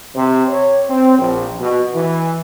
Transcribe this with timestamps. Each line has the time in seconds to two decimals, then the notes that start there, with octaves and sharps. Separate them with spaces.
0.15 C3
0.48 C#5
0.88 C4
1.19 A#1
1.59 B2
1.94 E3